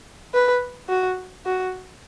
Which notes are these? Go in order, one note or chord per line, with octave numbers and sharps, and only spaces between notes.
B4
F#4
F#4